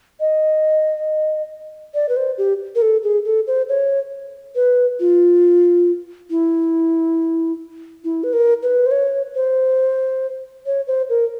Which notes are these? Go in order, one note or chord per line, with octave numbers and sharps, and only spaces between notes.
D#5
D5
B4
C5
G4
A#4
A4
G#4
A4
C5
C#5
B4
F4
E4
E4
B4
A#4
B4
C5
C#5
C5
C#5
C5
A#4